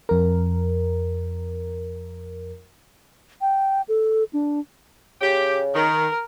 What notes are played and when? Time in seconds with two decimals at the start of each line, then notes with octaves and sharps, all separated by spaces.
0.09 F2 A#4
3.41 G5
3.88 A4
4.33 D4
5.21 C#3 G4
5.75 D#3 A#4